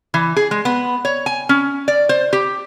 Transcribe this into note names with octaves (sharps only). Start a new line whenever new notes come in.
E3
G#4
G#3
B3
C#5
G#5
C#4
D5
C5
G4